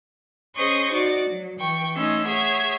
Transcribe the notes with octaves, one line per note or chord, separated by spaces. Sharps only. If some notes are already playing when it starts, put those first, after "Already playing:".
C#4 G#4 C5 D#5 C#6
D#4 F#4 D5
F#3
E3 G5 C#6
A3 C#4 D#4 C6 E6
G#4 C#5 E5 F#5